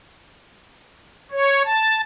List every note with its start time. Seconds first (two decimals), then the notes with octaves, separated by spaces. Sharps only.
1.31 C#5
1.65 A5